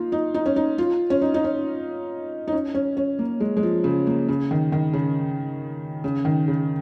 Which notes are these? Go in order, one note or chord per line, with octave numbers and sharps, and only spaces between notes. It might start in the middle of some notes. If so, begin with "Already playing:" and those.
Already playing: A#3 D#4 F4
D#4
D#4
C#4
D#4
F4
C#4
D#4
D#4
C#4
D#4
C#4
C#4
C#4
A#3
G#3
G#3
F3
C#3
A#3
C#3
D#3
D#3
C#3
C#3
D#3
C#3